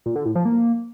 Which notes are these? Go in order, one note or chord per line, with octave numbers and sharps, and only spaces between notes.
A#2
D3
A2
F3
A#3